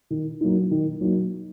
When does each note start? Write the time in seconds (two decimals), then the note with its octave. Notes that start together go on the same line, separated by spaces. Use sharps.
0.10 D#3
0.41 F#3 A#3 D#4
0.71 D#3
1.01 F#3 A#3 D#4